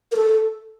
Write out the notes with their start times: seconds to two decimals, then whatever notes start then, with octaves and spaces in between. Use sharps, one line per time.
0.12 A#4
0.16 A4